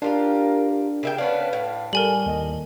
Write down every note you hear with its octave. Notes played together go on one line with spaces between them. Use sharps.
D4 F4 G4 A#4 F5
C#3 A#4 E5 G5
B3 C#4 D4 B4 F5
A2
G3 A4 A#4 G#5 F#7
D#2 D#5